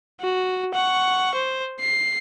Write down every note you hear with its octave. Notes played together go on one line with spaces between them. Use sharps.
F#4
F#5 C#6
C5
C7